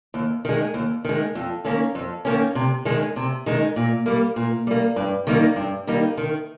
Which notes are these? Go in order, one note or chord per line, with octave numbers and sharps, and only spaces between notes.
D#2
D#3 G#3
D#2
D#3 G#3
F2
D#3 A#3 C#4
F2
D#3 A#3 C#4
C3
D#3 G#3 D#4
C3
D#3 G#3 D#4
A#2
G3 A#3
A#2
G3 A#3
G2
D#3 G3 A#3 D#4
G2
D#3 G3 A#3 D#4
D#3